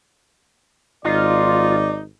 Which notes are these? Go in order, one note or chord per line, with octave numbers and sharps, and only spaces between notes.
G#1 D#4 F4 D5